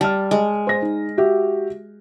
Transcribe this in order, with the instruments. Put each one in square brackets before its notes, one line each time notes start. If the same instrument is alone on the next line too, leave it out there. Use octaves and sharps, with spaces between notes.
[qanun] G3 [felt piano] A5 F6
[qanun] G#3
[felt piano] C5 A#6
D#4
F#4 G4 E5